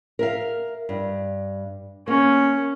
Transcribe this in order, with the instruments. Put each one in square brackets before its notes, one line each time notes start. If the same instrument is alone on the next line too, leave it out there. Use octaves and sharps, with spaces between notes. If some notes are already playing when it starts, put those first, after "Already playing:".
[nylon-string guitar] A#4 E5 F5
G2
[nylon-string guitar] A#3 [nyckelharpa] C#4